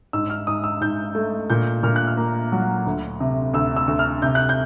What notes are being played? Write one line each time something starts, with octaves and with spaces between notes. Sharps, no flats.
G#2 E6
F6
G#2 D#6
E6
G#2 G6
A3
A#2 G6
A#2 F6
F#6
F6
A#3
F#3
D2
C3
D2 E6
E6
D2
F6
C3 G6
F#6
G6